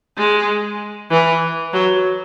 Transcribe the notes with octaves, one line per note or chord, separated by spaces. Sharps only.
G#3
E3
F#3